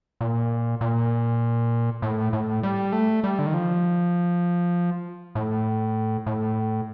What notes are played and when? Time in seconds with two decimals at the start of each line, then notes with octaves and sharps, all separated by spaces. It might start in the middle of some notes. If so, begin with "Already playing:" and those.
0.21 A#2
0.81 A#2
2.02 A2
2.33 A2
2.63 G3
2.93 A3
3.24 G3
3.39 D3
3.46 D#3
3.54 F3
5.35 A2
6.26 A2